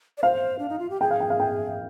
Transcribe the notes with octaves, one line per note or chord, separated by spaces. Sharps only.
D5
C5 F5
D4
D#4
F4
G4
G#4 G5
F5
G5
F5
G5